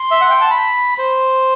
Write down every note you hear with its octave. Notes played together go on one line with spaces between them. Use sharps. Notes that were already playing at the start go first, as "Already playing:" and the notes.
Already playing: C6
E5
F#5
G5
A5
B5
C5